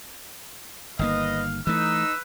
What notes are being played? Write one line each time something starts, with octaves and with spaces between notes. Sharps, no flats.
G1 D#3 A#3 B4 D#5 F5
E3 A3 D#4 B4 E6